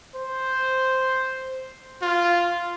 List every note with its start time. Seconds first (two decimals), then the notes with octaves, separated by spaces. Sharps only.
0.15 C5
2.02 F4